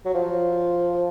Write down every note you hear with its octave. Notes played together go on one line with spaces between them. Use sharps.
F#3
F3